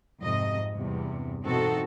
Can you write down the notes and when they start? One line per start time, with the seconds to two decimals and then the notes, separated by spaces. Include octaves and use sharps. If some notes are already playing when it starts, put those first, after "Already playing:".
0.20 F2 G#2 C3 D#5
0.73 E2 G2 C3
1.46 B2 E3 C4 D#4 F#4 A4